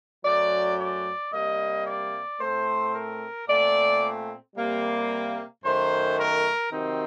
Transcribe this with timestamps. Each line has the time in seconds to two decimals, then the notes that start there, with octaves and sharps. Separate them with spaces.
0.24 F#2 F#3 A3 D5
0.78 D5
1.32 C3 G3 A#3 D#5
1.86 D5
2.39 A2 A3 C4 C5
2.94 A#4
3.47 A#2 A3 C4 D5
4.55 C3 G3 A#3
5.63 F#2 D#3 A3 C5
6.17 A#4
6.71 C3 D#3 F#3 C4 D#4